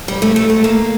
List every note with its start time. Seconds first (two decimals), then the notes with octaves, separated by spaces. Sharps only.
0.08 G3
0.22 A3
0.36 A3
0.50 A3
0.64 A#3